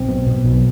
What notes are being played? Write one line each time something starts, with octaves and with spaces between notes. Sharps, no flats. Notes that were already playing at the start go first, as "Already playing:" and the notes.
Already playing: B1 C4
B2
B2
B1